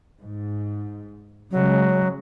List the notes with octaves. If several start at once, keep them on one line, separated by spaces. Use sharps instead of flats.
G#2
C#3 F#3 G#3